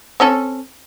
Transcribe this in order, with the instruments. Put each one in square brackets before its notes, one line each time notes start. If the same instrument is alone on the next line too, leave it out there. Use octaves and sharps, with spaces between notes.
[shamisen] C4 C#4 A4